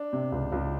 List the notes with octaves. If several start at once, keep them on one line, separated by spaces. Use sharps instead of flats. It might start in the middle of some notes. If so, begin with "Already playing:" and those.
Already playing: D4
C3
C#2
C#2